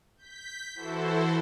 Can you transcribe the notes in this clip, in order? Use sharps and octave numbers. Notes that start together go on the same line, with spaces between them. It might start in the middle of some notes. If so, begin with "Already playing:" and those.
G6 B6
E3 E4 F#4 A4 C5